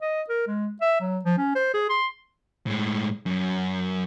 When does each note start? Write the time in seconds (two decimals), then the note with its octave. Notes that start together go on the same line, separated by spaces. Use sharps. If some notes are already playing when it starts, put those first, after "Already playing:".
0.01 D#5
0.29 A#4
0.47 G#3
0.81 E5
1.00 F#3
1.24 F3
1.38 C#4
1.55 C5
1.74 G#4
1.90 C6
2.67 A2 G#3
3.26 F#2